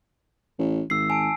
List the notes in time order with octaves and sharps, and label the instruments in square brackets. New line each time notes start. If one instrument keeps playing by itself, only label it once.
[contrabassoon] A1
[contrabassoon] G#1 [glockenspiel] E6 C7
[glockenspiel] G#5 A5 D7